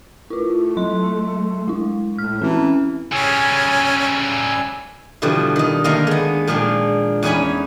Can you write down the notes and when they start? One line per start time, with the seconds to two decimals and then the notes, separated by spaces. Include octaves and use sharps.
0.30 A3 E4 F4
0.77 F#3 C6
1.68 G#3 E4
2.18 A2 F6
2.42 E3 C4 C#4
3.12 C#3 G3 C#4 G#5 E6
5.22 B2 D3 E3 F3 G3
5.56 D#3 D#5
5.84 D3 D#3 A3 A#3 F5 A#5
6.07 G#3 B3
6.47 A#2 F3 G#3 A#3 D4 G5
7.23 E2 C#4 D#4 C#5 G#5 B5